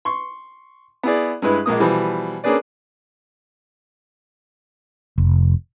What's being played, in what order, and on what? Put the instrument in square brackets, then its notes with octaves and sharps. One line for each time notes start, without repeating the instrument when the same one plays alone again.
[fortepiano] C6 C#6
B3 E4 G#4 D5
G2 G#3 E4 B4
A#1 G#3 A#3 D#6
B2 E3 F3 G3
A#3 C#4 D4 G#4 B4 D5
[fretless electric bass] F1